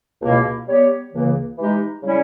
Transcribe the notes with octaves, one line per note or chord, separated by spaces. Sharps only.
C#2 B2 A#3 E4
G3 B3 G4 C#5
C#2 C#3 E3 A#3
E3 G#3 D#4 G4
C#3 G3 C#4 E4